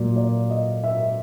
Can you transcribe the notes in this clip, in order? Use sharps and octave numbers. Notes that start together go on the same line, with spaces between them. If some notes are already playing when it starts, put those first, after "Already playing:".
Already playing: A#2 F#3 A#3 D5
D5
D#5
E5